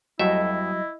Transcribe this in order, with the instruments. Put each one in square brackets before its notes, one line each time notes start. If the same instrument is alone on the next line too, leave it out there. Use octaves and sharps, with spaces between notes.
[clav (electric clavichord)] F2 A3 E5 [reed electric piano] F#3 G3 F#4 [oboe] E4 [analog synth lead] D#5